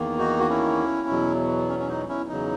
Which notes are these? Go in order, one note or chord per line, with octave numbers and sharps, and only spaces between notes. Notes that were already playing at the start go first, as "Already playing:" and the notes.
Already playing: E2 D#3 A#3
D#4 F#4
F#4
C#4 E4
E2 B2 F#3
C#4
C#4
D#4
C#4 E4
E2 C#3 F#3 D#4